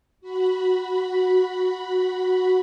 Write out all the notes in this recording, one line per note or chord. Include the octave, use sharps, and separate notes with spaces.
F#4 B5